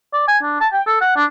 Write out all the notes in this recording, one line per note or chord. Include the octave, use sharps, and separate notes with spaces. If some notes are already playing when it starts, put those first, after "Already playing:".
D5
G#5
D4
A5
G5
A4
F#5
D4